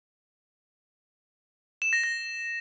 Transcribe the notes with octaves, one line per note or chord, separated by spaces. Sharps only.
E7
A#6
A#6